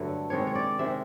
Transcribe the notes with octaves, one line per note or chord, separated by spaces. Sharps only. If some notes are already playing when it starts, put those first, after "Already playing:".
Already playing: G2 D3 F#3 A3
C3 D#3 G#3 C#5
C#5
D5
C3 D#3 G#3 E5